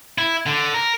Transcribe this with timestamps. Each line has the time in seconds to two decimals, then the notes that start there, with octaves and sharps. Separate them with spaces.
0.18 E4
0.46 D3
0.74 A#4